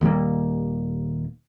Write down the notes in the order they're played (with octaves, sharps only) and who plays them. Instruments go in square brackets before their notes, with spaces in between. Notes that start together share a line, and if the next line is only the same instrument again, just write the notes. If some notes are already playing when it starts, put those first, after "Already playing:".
[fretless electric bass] D#1 D#2 G3 A#3